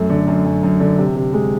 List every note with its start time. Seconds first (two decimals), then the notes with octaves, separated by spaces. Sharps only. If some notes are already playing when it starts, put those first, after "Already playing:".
Already playing: F#2 A3
0.10 D3
0.28 F#2
0.45 F#2
0.63 F#2
0.80 D3
0.98 C3
1.16 C3
1.33 G#3